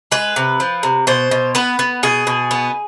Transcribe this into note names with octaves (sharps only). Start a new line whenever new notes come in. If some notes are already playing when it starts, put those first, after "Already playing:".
G#3 B4
C3
F3
C3
B2 C5
B2
B3 B4
B3
B2 G#4
B2
B3